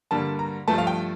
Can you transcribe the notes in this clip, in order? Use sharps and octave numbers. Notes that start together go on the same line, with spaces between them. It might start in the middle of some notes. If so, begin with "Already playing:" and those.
G2 D3 G3 A#3 A5
A#5
G2 F3 A3 A5
F5
G5